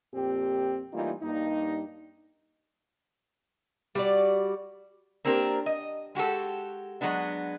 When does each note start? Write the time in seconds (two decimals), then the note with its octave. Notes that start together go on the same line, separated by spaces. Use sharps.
0.13 F2 A#2 C4 G4
0.93 E3 G3 A3 A#3 D#4 F4
1.22 G2 A#3 D#4
3.95 G3 F#4 D5
5.25 A#3 C4 D4 G4 A#4
5.66 D#5
6.15 G#3 F#4 G4 A4
7.01 F#3 G#3 B3 D4